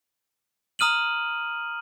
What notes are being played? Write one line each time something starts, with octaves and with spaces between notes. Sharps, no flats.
A#5 D#6 F6 D#7 F#7